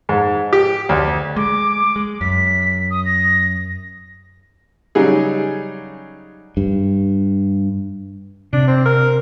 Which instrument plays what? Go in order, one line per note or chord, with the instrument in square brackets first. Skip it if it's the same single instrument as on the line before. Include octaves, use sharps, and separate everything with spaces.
[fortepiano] G#2
G4
D2
[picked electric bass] G#3 [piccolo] D6
[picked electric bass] G#3
[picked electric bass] F#2 [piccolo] B6
[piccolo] D#6
A#6
[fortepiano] C#3 F#3 G3 D#4 G#4
[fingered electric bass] G2
[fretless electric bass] C3 [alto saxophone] D4
[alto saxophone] C4
A#4